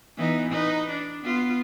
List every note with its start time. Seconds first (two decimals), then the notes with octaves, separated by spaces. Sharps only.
0.17 E3 B3 D#4
0.50 D#4 B4
0.90 D4
1.24 B3 F4